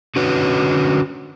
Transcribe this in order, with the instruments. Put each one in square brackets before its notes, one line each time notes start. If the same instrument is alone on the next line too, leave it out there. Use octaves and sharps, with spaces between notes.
[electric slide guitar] D3 C#4 F#4 B4 C#5